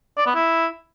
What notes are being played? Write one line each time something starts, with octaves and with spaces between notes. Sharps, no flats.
D5
B3
E4